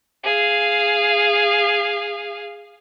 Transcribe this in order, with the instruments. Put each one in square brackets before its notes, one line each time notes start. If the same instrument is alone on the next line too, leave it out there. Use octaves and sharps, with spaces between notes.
[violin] G#4 F5